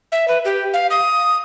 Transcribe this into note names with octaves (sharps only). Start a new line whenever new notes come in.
E5
B4
G4
F5
D#6